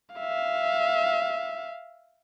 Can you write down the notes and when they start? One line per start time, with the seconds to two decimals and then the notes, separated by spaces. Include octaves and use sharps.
0.15 E5 F5